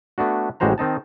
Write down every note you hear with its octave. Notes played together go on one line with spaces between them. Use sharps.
A3 B3 D4 F#4
A1 G3 G#3 F#4 C5 A#5
D#3 C4 D#4 A5